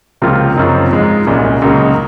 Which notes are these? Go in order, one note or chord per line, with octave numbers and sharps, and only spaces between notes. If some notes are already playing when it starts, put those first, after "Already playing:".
C#2 C3 F3 A#3 F4
F#2 C#3 F3 C4 D#4
G#2 F3 G#3 D#4
C2 A#2 G#3 C#4
C#2 C#3 F#3 A#3 D#4